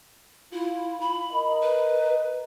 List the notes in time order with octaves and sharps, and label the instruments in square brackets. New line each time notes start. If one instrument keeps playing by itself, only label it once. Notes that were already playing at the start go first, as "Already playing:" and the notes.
[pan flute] E4 [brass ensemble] F4
[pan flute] B5
[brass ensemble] A#4 D#5
[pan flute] B4